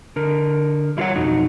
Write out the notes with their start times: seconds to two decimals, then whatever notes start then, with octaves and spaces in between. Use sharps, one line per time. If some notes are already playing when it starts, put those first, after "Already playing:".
0.16 D3 A#4
0.97 G3 E4 F4 A4 C#5 F#5
1.16 B1 F2 D#4 F#4